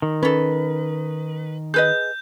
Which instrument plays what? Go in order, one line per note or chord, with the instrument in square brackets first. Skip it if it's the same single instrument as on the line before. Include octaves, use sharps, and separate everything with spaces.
[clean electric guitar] D#3
[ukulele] C#4 A4 [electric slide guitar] B4
[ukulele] G#4 B4 D#5 [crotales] G6